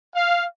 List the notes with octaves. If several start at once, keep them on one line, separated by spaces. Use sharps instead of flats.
F5